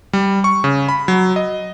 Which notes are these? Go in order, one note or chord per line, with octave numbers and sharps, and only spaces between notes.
G3
C#6
C#3
B5
F#3
D#5